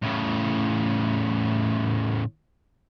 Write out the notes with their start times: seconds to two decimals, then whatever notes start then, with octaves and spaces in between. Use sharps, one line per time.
0.02 A2 C#3